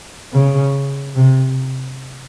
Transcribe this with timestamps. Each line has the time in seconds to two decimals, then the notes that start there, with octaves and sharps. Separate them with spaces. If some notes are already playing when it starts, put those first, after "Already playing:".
0.33 C#3
1.16 C3